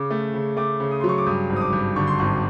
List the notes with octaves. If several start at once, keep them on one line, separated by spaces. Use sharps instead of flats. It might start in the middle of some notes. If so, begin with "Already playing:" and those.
Already playing: C#3 D6
A3
C#3
A3 D6
C#3
D#6
F#3 C6
C#6
D6
G2 D#6
G#1
D#6
D6
G2
D3 C#6
C6
G#1 C#6